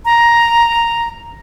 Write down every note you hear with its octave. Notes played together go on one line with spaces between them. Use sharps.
A#5